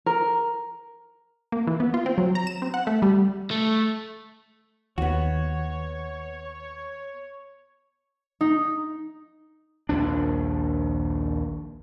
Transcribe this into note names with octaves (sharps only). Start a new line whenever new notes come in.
A#4
A#3
E3
B3
F4
C4
F#3
A#5
E7
C4
F#5
A3
G3
A3
D#2 B3 F#4 C#5
D#4
A#1 D#2 D4